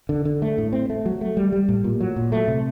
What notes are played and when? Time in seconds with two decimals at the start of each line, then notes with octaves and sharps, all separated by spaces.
0.09 D3
0.25 D3
0.42 A3
0.58 A2
0.73 C4
0.90 A3
1.06 F#3
1.21 A3
1.37 G3
1.52 G3
1.69 A2
1.84 A#2
2.01 F#3
2.16 A#2
2.32 A3
2.48 C3